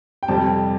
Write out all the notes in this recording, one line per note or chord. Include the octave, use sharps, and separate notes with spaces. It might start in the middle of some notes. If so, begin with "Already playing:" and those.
G5
F2 C3 G3 C4 A5